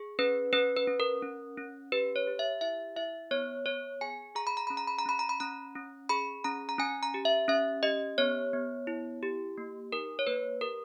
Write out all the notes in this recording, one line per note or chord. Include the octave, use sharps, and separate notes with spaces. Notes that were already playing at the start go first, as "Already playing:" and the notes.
Already playing: G#4
C#4 B4
C#4 B4
B4
C#4
A#4
C#4
C#4
G4 B4
C#5
G4
E5
E4 E5
E4 E5
B3 C#5
B3 C#5
G#4 G#5
G#4 A#5
B5
A#5
C#4 B5
A#5
B5
A#5
C#4 B5
A#5
B5
C#4 A#5
C#4
G#4 B5
C#4 A#5
A#5
C#4 G#5
A#5
G4
E5
C#4 E5
G4 D#5
B3 C#5
B3
E4
G4
A#3
D#4 A#4
C#5
A#3 B4
G4 A#4